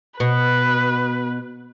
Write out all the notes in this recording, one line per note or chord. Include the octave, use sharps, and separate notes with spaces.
B2 B4